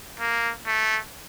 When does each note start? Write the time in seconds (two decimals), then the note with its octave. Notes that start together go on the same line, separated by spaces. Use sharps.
0.20 A#3
0.66 A3